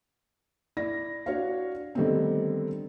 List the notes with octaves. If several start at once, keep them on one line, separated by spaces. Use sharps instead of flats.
E4 D5 A#6
D4 F#4 C#5 F5
D3 D#3 G3 A3 B3 C4